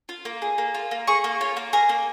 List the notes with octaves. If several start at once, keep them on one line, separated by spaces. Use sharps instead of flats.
F4
A#3
G#4
A#3
F4
A#3
G#4 C#6
A#3
F4 C#5
A#3
G#4 A#4
A#3